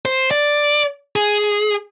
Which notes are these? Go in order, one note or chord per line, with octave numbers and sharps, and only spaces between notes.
C5
D5
G#4